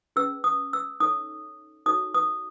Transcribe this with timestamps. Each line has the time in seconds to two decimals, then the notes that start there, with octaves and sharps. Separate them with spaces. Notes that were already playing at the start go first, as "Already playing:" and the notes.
0.16 C#4 G#4 B4 E6
0.44 D#6
0.73 E6
1.00 D#4 A4 C#5 D#6
1.86 D#4 F#4 A4 C#5 D#6
2.14 D#6